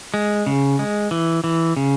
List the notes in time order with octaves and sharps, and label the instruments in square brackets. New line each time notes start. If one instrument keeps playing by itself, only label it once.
[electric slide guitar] G#3
C#3
G#3
E3
E3
C#3